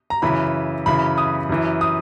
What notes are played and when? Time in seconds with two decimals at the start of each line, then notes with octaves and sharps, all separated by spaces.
0.10 A#5
0.22 F#2 C#3 E3 B5
0.86 F#2 C#3 E3 B5
1.18 D#6
1.49 F#2 E3
1.81 D#6